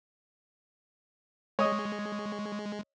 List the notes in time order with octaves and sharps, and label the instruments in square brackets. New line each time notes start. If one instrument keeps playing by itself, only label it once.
[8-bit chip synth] G#3 [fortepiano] C#5 D#5